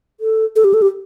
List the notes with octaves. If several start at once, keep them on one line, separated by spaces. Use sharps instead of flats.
A4
A4
G4
A4
G4